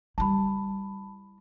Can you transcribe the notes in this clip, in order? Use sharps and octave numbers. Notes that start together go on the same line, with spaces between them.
G3 E4 A5 B5